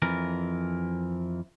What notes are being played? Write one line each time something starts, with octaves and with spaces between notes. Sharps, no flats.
F2 E3 A#4